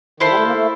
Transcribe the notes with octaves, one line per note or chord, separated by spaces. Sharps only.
D#3 E4 A4 C5 F5
G3
A3
A#3
A3